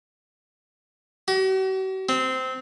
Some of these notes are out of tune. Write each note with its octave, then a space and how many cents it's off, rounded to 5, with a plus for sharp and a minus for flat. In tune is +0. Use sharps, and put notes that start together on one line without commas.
F#4 +45
C4 -15